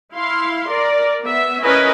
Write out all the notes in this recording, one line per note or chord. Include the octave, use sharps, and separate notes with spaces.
E4 F5 C6
A#4 D5
B3 E5
C#4 E4 A#4 B4 D#5 G#5